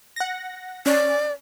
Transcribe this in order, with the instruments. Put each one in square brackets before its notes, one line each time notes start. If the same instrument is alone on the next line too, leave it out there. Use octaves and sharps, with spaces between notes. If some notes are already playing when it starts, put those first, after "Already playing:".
[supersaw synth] F#5 A#6
[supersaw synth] C#4 [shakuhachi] D5